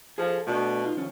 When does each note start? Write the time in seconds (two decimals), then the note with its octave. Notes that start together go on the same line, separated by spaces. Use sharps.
0.18 F3 G#4 A4 F5
0.47 B2 A3 D4
0.83 D#4 F4
0.97 D#3 F3 C#4